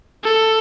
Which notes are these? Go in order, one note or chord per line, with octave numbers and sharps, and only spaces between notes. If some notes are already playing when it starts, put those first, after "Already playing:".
A4